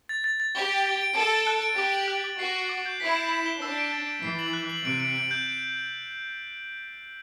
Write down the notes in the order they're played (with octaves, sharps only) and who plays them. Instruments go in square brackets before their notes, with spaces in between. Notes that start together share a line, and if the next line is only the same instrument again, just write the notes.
[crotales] A6
A6
A6
[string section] G4 [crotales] G7
[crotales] D7
A6
D7
[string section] A4 [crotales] D7
[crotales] A6
F#6
D7
[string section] G4 [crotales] D6
[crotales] F#7
F#6
D6
[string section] F#4 [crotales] C7
[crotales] C7
D6
G6
[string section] E4 [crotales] B6
[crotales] E7
E7
G7
[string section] D4 [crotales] E6
[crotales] D7
A6
D7
[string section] E3 [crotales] C7
[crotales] F#7
F#6
F#7
[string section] C3 [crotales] D7
[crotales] D7
D7
G6
D7